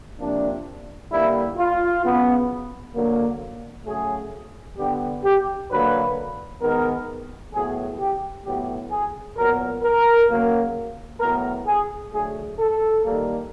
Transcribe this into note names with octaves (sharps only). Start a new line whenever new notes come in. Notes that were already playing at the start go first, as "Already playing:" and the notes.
C3 F3 A#3 D4
D3 G3 A#3 E4
F4
C#3 F#3 B3
D3 F#3 A#3
C#3 F#3 A3 G#4
D3 G3 B3 G4
G4
D3 F#3 A#3 B4
D#3 G#3 B3 A#4
A2 F#3 B3 G#4
G4
A2 F#3 B3 G4
G#4
A#2 F#3 B3 A#4
A#4
C#3 F#3 A#3
A2 F#3 B3 A#4
G#4
D3 F#3 A3 G#4
A4
D#3 G3 A#3